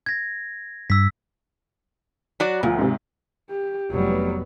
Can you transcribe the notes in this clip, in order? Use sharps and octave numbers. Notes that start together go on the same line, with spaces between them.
G#6 A#6
G2 E6 B6
F#3 F#4 D5
D2 A#2 F3
G#2 C3
G4
F1 F#3 G3 B3